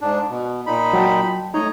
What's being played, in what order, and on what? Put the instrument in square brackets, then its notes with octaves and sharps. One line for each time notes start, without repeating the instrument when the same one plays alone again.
[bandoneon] G#2 D4
B2
A#2 D#4 B5
[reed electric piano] F#3 G5 A5
[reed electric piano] A3 D#4 [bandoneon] C#5 D#5 A#5